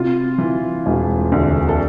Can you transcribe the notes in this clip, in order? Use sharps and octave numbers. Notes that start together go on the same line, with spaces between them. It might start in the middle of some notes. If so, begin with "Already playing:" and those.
Already playing: C3 F4
E3
E1
D2
A4